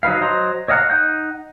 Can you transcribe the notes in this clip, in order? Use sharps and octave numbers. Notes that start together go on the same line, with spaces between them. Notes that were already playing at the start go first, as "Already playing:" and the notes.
F#3 D#4 B4 F5
F#3 C5 D#5 A#5 C6
C#5 D#5 F5 F#5 A#5
D#4 F#5 F#6 G6